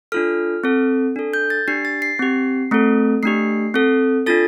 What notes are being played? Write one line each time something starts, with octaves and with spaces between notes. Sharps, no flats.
D4 F4 A4 F6
C4 A4
D4 A4
G6
A6
D4 G4 C7
A6
C7
C4 G4
A3 C4 A4
A3 D4 G4 C7
C4 A4
D4 F4 A4 A6